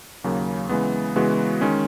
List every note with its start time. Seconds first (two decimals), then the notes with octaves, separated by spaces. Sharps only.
0.24 D#2 C#3 F#3 A#3
0.69 C#3 E3 G#3 B3
1.16 C#3 E3 G#3 B3 F#4
1.61 D#3 G#3 C#4